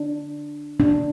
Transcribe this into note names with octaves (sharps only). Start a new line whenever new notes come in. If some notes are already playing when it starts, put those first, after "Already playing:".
Already playing: D4
D4